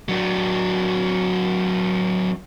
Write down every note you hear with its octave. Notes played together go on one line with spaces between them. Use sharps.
F#3 D4